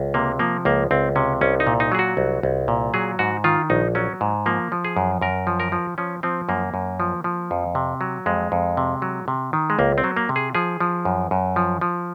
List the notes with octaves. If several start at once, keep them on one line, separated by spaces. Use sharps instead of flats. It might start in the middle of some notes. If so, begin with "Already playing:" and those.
Already playing: C#2
C3 A#3
F3 A#3
C#2 A#3
C#2 C4
C3 C#4
C2 C#4
D#4
A#2
D#4
F#3 G#4
F#4
C2
C2
A#2
F#3 G#4
G#2 F#4
D#3 F4
A#1 D#4
F#3 C#4
G#2
F3 A#3
F3
G#4
F#2
F#2 A#4
F3
A#4
F3
F3 C#4
F3 C4
F#2 A#3
F#2
F3
F3
F2
C3
F#3
F2 G#3
F2
C3
F#3
C3
D#3
G#3
C#2 A#3
C4
F#3
A#3
C3
G#4
F3 G#4
F3
F#2
F#2
F3
F3